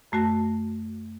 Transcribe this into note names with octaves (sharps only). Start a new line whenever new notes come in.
F#2 A3 F#4 A5 A#6